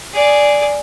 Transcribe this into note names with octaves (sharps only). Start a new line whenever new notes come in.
G#4 D5